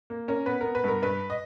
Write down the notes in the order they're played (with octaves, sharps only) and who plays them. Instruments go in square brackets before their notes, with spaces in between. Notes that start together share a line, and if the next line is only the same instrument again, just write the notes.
[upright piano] A#3
C#4 A#4
B3 B4
B3 A#4
B4
G2 A#4
G2 B4
D#5